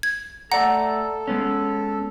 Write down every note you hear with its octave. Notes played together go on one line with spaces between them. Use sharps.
G#6
A3 A4 D5 F#5 A#5
G#3 B3 C#4